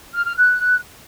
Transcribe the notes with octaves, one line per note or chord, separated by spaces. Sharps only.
F6
F6
F#6